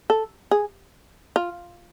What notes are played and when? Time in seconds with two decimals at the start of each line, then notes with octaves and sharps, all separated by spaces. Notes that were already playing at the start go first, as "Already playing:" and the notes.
0.10 A4
0.51 G#4
1.36 F4